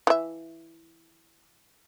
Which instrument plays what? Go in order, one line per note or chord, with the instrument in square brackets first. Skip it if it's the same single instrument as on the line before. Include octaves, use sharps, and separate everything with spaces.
[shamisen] E3 E5